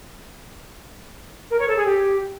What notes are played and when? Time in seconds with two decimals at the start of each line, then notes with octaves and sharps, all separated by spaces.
1.51 A#4
1.59 C#5
1.68 A4
1.76 G#4
1.85 G4